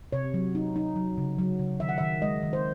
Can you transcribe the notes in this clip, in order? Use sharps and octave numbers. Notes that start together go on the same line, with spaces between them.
C3 C#5
F#3
D#4
D#4
F#3
C#3
F#3
C#3
D#3 E5
F#5
D#3 E5
G#3 D#5
D#3
C5